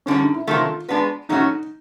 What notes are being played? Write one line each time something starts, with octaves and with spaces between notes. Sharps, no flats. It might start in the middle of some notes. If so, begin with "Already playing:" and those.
F#2 D3 G3 C#4
D#4
E4
C3 D#3 F#3 A3 F4
G#3 B3 D4 F#4 B4
A#2 F#3 A3 C#4 D#4 F#4